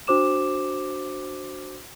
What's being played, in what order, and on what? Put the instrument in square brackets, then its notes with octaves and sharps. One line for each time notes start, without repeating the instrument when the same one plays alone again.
[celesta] D4 F#4 C5 D6 E7